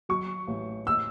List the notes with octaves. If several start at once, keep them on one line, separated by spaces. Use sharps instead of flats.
F#3 C#6
A1
E6